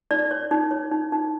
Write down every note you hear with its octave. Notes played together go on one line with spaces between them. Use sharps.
D#4 D5
C#5
D#4
C#5
D#4
D#4